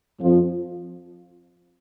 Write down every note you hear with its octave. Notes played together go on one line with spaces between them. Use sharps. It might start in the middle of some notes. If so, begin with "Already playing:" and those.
F2 F3